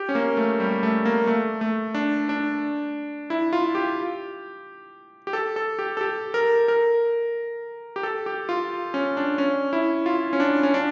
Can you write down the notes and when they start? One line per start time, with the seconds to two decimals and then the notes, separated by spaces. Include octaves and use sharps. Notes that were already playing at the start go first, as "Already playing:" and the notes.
Already playing: G4
0.09 C#4
0.15 A#3
0.37 A3
0.60 G3
0.83 A3
1.05 A#3
1.27 A3
1.61 A3
1.95 D4
2.29 D4
3.30 E4
3.53 F4
3.75 G4
5.27 G4
5.33 A4
5.56 A4
5.79 G4
5.97 A4
6.01 G4
6.34 A#4
6.68 A#4
7.96 G4
8.03 A4
8.26 G4
8.49 F4
8.94 C#4
9.17 D4
9.38 C#4
9.73 E4
10.06 F4
10.33 C#4
10.40 D4
10.63 C#4
10.74 D4